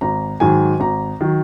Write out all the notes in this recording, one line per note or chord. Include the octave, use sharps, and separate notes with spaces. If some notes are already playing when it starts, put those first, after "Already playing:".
G#1 A#5
G#2 D#3 F#3 G#5
G#1 A#5
D#3 F#3